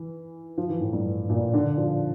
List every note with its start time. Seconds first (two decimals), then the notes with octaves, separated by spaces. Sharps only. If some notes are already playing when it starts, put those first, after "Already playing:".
Already playing: E3
0.58 F3
0.70 E3
0.81 A2
0.93 G2
1.29 A#2
1.54 D3
1.77 F3